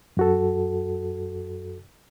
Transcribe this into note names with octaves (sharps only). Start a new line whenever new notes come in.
F#2 F#4 A4